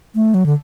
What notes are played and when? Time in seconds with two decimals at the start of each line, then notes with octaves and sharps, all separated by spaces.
0.15 A3
0.34 F#3
0.46 D3